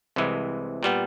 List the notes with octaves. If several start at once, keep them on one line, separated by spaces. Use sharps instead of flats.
C2 C3 E3 G#3
A#2 G3 B3